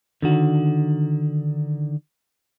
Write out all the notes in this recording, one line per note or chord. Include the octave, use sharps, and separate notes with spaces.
D3 D#3 F#4